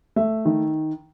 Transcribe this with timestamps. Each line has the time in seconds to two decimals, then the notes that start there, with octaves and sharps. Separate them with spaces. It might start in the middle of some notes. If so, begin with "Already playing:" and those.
0.16 A3 E5
0.45 D#3